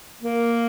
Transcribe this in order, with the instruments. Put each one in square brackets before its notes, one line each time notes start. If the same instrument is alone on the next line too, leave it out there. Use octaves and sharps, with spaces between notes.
[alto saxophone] A#3